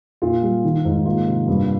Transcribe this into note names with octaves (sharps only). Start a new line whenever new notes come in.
A#2 F4
G3
D#3
G#2
A#3 F4
C3
G2